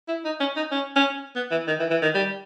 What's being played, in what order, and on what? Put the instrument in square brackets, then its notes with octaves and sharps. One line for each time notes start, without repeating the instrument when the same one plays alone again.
[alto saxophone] E4
D#4
C#4
D#4
C#4
C#4
B3
E3
D#3
E3
E3
D#3
G3